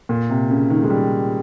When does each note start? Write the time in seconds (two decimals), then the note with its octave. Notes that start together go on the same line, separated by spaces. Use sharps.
0.09 A#2
0.30 C3
0.50 C#3
0.70 D#3
0.83 G#3
0.90 G3